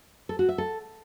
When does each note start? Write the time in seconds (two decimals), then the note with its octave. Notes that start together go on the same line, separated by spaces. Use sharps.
0.29 A4
0.39 F#4
0.49 E5
0.58 A4